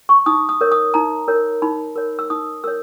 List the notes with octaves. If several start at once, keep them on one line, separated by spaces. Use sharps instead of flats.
C#6
D#4 D#6
D#6
A#4 C#5
D#6
D#4 A#5
A#4 C#5
D#4 B5
A#4 C#5
E6
D#4 D#6
A#4 C#5 E6